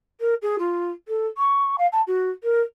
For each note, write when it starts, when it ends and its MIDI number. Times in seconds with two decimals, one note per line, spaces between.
0.20 0.34 70
0.42 0.56 68
0.58 0.91 65
1.08 1.26 69
1.37 1.76 85
1.78 1.87 77
1.92 2.01 81
2.07 2.30 66
2.43 2.61 70